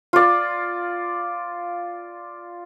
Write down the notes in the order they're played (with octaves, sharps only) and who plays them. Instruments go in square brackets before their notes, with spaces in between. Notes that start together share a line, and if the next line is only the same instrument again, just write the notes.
[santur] F4 D5